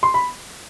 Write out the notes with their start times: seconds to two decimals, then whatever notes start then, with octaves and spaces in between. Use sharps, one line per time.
0.03 C6
0.14 B5